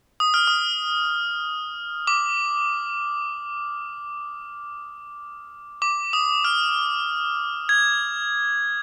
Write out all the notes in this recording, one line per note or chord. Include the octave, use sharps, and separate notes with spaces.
D#6
F6
D#6
D6
D6
D#6
F6
G#6